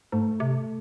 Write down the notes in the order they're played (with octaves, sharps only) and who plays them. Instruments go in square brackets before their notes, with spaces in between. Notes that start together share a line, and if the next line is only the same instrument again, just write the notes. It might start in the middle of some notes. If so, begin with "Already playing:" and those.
[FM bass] G#2 [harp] A3
[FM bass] C3